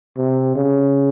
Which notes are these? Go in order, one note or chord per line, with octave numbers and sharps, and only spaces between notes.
C3
C#3